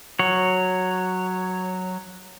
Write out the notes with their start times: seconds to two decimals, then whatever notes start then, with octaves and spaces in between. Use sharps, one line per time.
0.19 F#3 C#5